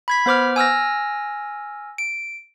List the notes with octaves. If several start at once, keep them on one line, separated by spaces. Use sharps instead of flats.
B5 G#6 B6
B3 C5 D6 F6
G#5 E6 F6 A#6
D7